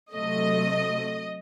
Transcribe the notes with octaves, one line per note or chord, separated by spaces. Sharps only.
C3 F#3 A3 D#5